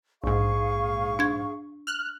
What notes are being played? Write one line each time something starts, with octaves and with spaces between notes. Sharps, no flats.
A#1 G#2 G#4 F5 C#6
D4 G#6
F6 F#6